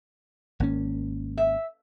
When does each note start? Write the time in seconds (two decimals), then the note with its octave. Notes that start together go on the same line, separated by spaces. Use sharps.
0.60 G#1 A#3 C#4
1.37 E5